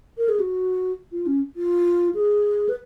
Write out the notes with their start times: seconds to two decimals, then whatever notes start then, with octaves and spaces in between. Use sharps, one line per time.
0.18 A#4
0.29 G#4
0.40 F#4
1.12 F4
1.27 C#4
1.56 F4
2.15 G#4
2.69 B4